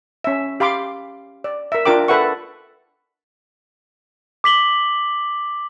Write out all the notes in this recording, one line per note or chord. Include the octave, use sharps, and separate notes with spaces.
C#4 E5
G4 F5 B5 C6 D6
D5
A#4 E5
D4 F4 A#4 G5 D6
A4 B4 E5 F#5 C#6
D6 B6 F#7 G7